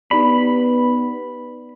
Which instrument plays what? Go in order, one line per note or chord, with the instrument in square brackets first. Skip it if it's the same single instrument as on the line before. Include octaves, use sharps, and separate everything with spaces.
[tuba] B3 [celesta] D#4 G4 D5 [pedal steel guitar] B5